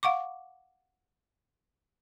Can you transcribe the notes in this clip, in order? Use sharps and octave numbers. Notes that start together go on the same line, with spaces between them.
F5 F#5 C#6 D6